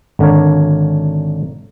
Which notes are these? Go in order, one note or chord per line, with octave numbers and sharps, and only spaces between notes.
G#1 D3 D4 A#4 C#5